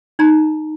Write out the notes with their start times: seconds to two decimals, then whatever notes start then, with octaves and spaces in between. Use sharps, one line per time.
0.19 D#4 A#5